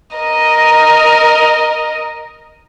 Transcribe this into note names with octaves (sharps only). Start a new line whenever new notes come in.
A#4 D#5